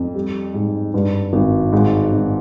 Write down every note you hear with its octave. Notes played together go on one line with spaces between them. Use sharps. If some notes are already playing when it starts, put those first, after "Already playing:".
Already playing: F2
G3
G#2
G2
G#1
G#2
G#1